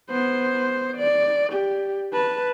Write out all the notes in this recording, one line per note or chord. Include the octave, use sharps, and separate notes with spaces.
B3 C5
D5
G4
B4 A5